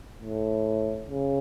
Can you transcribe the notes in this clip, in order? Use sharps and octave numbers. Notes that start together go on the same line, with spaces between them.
A2
C#3